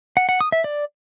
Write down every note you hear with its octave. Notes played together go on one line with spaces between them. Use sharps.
F#5
F#5
D#6
E5
D5